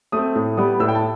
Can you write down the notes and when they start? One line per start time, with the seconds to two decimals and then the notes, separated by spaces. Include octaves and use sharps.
0.12 A3 C4 D#6
0.35 A2
0.57 G3 B3 D#6
0.80 A2 E6
0.88 G5
0.95 A5